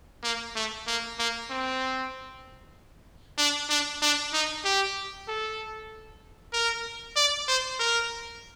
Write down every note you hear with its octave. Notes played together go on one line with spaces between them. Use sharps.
A#3
A3
A#3
A#3
C4
D4
D4
D4
D#4
G4
A4
A#4
D5
C5
A#4